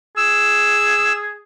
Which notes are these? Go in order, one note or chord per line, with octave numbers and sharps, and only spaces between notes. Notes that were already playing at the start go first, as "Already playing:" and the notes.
G#4 E6